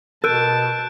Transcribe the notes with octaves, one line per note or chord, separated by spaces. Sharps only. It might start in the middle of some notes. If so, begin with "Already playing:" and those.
B2 A#4 A5 F#6 G6 D7